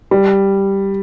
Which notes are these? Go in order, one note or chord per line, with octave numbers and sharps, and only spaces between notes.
G3